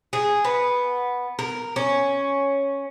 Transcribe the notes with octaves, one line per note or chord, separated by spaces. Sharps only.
G#4
B3
A#4
C#4